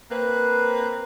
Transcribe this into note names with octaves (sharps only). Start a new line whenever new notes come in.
A#3 C4 B4